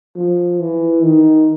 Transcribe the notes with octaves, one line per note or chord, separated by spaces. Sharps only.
F3
E3
D#3